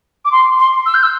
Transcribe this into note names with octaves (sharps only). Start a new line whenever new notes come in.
D6
C6
C6
E6
G6
E6